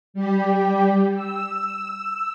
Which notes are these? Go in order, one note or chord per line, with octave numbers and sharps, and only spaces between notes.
G3 G4
E6